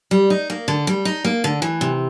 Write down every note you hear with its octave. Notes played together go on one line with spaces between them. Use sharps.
G3
D#4
A#3
D3
G3
D#4
A#3
D3
E3
C3